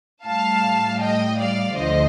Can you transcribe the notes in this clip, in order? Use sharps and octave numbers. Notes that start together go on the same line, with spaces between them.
A2 G3 F5 A5
D#5 G5
D5 F5
D2 D3 F3 A3 C5 D#5